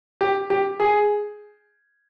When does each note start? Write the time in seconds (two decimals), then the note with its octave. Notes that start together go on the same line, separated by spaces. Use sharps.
0.21 G4
0.50 G4
0.80 G#4